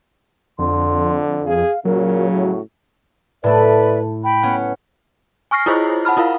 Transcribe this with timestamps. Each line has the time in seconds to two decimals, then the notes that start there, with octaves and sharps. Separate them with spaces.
0.59 F2 D3 C6
1.46 G#4 F5
1.85 A#2 C#3 F#3 A#4
2.33 A2 F#4
3.44 A2 A3 B4 D5 E5
4.25 G5 B5
4.43 B3 C#4
5.51 G#5 C#6 F6 A#6 C7
5.66 E4 F4 G#4 C5 C#5 D#5
6.05 F#5 A5 B5 F6
6.17 E4 F4 A#4 F5